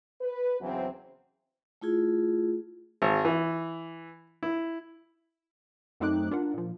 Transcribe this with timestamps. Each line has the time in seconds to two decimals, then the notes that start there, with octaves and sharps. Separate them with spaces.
0.21 B4
0.60 E2 C#3 E3 F#3 C4 C5
1.82 A3 E4 F4 G#4
3.02 G#1
3.25 E3
4.43 E4
6.00 F#2 A3 C4 D#4 D6 F#6
6.31 D4 F4 A#4 F#5
6.54 A#2 F3